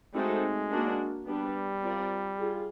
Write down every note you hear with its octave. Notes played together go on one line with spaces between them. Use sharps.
G#3 A3 C4 D#4 F#4 A4
A#3 D4 F#4 A#4
G3 B3 D4 G4 B4
C4 F4 A#4 D5
F4 G#4